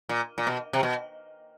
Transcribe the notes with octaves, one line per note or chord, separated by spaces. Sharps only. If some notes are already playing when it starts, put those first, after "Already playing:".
A#2
A#2
B2
C3
B2